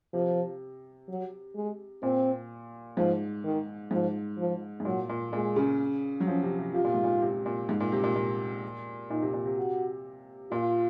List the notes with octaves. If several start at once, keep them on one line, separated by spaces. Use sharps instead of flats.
C3 F3
F#3
G#3
A#2 C4
G#2 F3
D#3
G#2 F3
F3
G#2
A#2 F#3
A#2
A#2 G#3
C#3
F#3
F3 C#4
C3
C3
C3 F4
A#2
G#2
A#2
C3
A#2
G#2
A#2
C3
A#2
A#2
A#2 D#4
C3
A#2
C3
F#4
A#2 F4